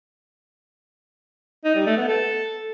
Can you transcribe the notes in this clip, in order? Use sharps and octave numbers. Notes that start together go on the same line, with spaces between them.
D#4
G3
A3
B3
A4